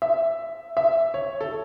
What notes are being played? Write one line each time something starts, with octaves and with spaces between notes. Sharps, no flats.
E5
E5
C#5
A4